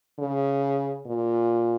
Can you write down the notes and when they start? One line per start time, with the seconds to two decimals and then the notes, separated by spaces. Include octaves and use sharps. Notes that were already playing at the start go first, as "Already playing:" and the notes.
0.19 C#3
1.06 A#2